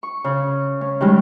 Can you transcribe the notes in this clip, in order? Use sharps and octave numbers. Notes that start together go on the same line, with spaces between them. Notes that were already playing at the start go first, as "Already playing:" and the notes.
C#6
C#3
C#4
D#3 G3 G#3 C#4